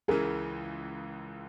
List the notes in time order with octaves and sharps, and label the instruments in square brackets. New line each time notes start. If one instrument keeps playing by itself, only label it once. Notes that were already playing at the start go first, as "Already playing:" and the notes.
[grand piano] C#2 C#3 E3 [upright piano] G#4 A#4